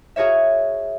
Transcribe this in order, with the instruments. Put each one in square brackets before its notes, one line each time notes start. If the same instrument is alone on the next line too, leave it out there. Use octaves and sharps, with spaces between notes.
[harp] F#4 G#4 A#4 C#5 E5